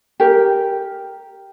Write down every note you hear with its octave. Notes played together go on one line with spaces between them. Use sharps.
G4 A#4